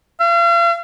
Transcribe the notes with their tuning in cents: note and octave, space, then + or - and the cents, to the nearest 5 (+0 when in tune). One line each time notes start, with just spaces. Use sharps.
F5 -40